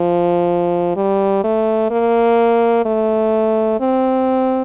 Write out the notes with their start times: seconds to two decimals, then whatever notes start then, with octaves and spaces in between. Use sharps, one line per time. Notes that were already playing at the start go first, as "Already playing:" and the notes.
Already playing: F3
0.96 G3
1.44 A3
1.91 A#3
2.85 A3
3.80 C4